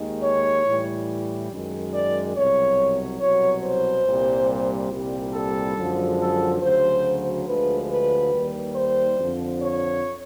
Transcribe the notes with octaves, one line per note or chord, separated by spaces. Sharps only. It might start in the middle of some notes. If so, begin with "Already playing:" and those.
Already playing: D#2 D#3 G#3
C#5
A2 E3 G3
F#2 D#3 G#3
D5
C2 B2 F#3 C#5
C2 B2 F#3 C#5
C5
C2 A#2 G3
C2 A#2 G3
A4
F#2 D3 F3 G#3
A4
D2 C#3 F#3 C5
D2 D3 F3 G#3 B4
B4
D#2 D#3 G3
C5
F2 D3 F3
C#5